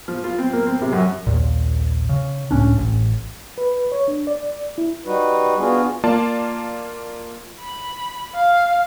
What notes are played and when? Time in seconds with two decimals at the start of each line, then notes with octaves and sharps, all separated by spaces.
0.08 F3
0.24 F4
0.38 C4
0.53 A#3
0.67 C4
0.82 C3
0.93 F#2
1.27 A#1 D#2 A#2
2.09 C#3
2.51 C#2 A2 C#4 D4
2.78 A1
3.58 B4
3.92 C#5
4.08 D4
4.27 D5
4.78 E4
5.06 G3 D#4 F#4 B4
5.59 B3 D4 F4 F#4 G#4
6.04 A#3 F4 D5 A5
7.60 B5
8.36 F5